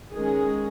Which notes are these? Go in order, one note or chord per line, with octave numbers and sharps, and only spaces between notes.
D#3 G#3 C#4 G#4